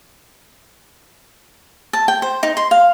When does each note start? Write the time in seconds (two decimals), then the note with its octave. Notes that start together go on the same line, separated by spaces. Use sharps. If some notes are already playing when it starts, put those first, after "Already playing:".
1.93 A5
2.08 G5
2.22 C5
2.43 D#4
2.57 C6
2.71 F5